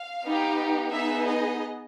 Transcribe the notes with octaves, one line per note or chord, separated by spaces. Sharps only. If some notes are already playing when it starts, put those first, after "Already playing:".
Already playing: F5
B3 D#4 G4
B3 D#4 G#4 E5
D#5